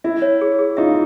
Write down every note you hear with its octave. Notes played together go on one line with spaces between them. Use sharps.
E4 E5
C#5
G#4
G#4
D#4 F4 E5